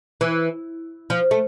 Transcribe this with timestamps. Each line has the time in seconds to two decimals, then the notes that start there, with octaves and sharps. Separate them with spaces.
0.21 E3
1.10 F3
1.31 A3